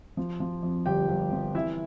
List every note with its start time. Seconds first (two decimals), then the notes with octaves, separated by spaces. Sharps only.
0.17 F3
0.40 F3
0.63 F2
0.86 G1 G4 G5
1.09 G1
1.31 F3
1.54 E3 E4 E5